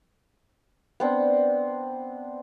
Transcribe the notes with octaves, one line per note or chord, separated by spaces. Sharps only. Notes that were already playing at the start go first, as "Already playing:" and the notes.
B3 C4 D4